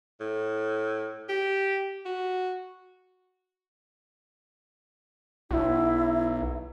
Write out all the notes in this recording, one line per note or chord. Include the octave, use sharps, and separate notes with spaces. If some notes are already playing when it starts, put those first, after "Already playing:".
A2
G4
F#4
B1 E4